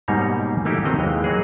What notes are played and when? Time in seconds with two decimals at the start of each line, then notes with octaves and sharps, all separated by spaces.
0.08 G#2 B2 G3 A#3 D#4 C#5
0.65 A3 A#3 D#4 E4 G4
0.85 D3 D#3 C4 F#4 D#5 A#5
0.99 D#2 E3 G#3
1.24 F#3 A#3 F#4 G#4